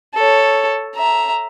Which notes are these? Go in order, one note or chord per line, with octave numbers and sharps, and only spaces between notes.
A4 C#5
E5 A#5